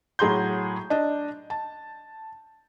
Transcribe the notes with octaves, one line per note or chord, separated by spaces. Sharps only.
A2 F#3 G#4 A#5 C6 G6
D4 D#5
A5